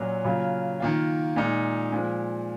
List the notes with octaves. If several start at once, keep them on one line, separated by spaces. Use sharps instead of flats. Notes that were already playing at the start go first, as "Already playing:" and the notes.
Already playing: A#2 F#3 C#4 F#4
C#3 F#3 A#3 F4
D#3 A#3 F4
A#2 G#3 D#4
A#2 F3 G#3